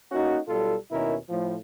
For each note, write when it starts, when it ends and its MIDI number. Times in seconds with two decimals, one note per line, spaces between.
0.12 0.38 58
0.12 0.38 61
0.12 0.38 63
0.12 0.38 66
0.48 0.76 35
0.48 0.76 47
0.48 0.76 55
0.48 0.76 65
0.48 0.76 69
0.91 1.16 39
0.91 1.16 47
0.91 1.16 51
0.91 1.16 61
0.91 1.16 64
0.91 1.16 70
1.30 1.56 45
1.30 1.56 53